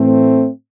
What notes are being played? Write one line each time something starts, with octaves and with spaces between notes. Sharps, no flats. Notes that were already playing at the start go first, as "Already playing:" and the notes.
Already playing: A2 E3 A3 C4